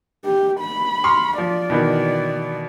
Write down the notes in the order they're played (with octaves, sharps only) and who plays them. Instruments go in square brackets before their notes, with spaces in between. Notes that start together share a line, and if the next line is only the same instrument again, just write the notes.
[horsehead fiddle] G4
B5
[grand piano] C6 C#6 F6
[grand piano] F3 [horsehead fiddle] D5
[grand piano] B2 D#3 E3